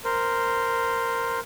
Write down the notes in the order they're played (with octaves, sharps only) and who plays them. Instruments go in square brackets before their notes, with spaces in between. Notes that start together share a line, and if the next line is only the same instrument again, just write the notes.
[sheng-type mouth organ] A#4 C5